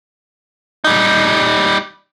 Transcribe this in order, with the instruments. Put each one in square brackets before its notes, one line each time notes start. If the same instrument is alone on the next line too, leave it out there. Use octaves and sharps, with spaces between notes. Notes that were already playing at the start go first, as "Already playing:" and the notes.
[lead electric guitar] G3 D#4